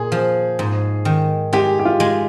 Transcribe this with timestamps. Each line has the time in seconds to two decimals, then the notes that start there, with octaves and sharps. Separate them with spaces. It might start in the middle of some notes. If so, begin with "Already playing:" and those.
Already playing: A#2 G#4
0.12 F3
0.59 G#2
1.05 D#3
1.53 G#3 G4
1.79 G4
1.85 F4
2.00 G#3